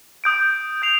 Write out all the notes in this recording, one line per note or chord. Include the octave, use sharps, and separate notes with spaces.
D#6 G6 D7
G6 C7 F7